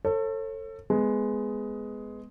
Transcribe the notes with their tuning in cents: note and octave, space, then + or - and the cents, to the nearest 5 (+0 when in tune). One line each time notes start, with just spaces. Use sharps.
A4 +25 C#5 -40
G#3 +10 B3 +15